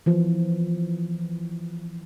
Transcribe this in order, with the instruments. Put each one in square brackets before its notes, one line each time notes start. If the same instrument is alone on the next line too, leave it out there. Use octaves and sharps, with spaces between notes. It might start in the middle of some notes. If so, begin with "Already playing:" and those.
[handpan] E3 F3